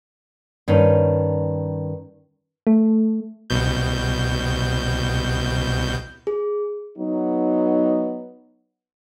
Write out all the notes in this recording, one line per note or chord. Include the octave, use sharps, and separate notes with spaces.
G2 D#3 C#4
A3
C2 B2 G6
G#4
F#3 B3 D#4